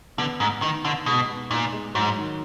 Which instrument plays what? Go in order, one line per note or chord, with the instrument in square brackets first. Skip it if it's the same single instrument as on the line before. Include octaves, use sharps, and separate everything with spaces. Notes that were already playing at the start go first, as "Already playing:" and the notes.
[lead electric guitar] D3 [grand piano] B3
[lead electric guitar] G#2 [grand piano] B3
[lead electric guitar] D#3 [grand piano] D#4
[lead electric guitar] D3 [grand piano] D#4
[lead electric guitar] B2 [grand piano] G#3
[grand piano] B3
[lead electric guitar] A#2 [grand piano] D#4
[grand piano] G#3
[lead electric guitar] G#2 [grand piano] F#3
[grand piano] D#3